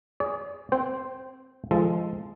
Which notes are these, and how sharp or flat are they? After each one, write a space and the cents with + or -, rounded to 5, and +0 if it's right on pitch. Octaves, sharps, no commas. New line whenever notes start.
G#4 +0 D5 -45
C4 +0 C5 +0 G5 -15
F3 -20 G#3 +0 A4 +0